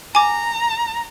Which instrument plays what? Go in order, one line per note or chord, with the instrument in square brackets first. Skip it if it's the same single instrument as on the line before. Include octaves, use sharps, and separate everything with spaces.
[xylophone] G#5 D6 [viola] A#5